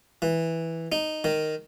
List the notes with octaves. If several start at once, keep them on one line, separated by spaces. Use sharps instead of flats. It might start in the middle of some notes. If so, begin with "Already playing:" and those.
E3
D#4
D#3